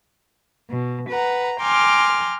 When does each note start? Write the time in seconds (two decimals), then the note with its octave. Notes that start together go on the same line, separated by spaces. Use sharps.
0.69 B2
1.08 B4 F#5 A#5
1.60 G5 G#5 A#5 C6 D6 F6